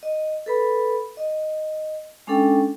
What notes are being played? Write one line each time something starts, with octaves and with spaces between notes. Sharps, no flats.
D#5
A4 B4 B5
D#5
G#3 C#4 D4 A4 G5